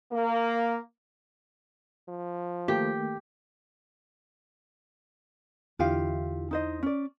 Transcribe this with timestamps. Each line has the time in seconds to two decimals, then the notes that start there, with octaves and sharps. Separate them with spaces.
0.12 A#3
2.08 F3
2.68 D#3 A3 A#3 G4
5.79 E2 D3 E4 F4 G4 F5
6.51 D#4 C5 D#5
6.83 C#4 D5